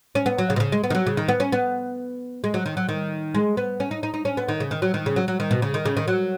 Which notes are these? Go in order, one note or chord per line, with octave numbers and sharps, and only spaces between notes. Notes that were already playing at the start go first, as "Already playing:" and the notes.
C#4
B3
F#3
C#3
B2
C#3
G#3
B3
D#3
F#3
C#3
D#3
B3
C#4
B3
G#3
F#3
D#3
F#3
D#3
G#3
B3
C#4
D#4
D#4
D#4
C#4
B3
D#3
C#3
D#3
F#3
D#3
C#3
F#3
F#3
D#3
B2
C#3
D#3
C#3
D#3
F#3